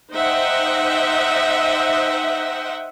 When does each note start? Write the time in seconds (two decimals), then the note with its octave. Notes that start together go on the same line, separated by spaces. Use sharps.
0.12 D#4 C5 D#5 E5 F#5 G5